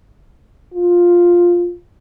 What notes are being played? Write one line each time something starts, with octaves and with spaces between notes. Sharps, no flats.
F4